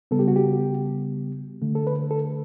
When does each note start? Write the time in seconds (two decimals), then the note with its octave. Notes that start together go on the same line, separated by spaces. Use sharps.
0.11 C#3 G3 B3 A4
0.19 G4
0.28 F#4
0.36 G4
1.62 D3 A3
1.75 A4
1.87 B4
2.11 A4